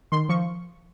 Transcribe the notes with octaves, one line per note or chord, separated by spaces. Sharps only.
D#3 C6
F3 C#6